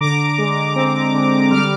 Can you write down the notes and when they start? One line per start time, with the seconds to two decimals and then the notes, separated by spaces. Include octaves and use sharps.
0.01 D3 A#5 D6
0.38 G#3
0.76 C4
1.14 D3
1.51 G3 D6 F6